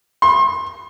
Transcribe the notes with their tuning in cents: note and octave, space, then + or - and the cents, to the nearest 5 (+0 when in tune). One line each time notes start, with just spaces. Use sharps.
C6 +40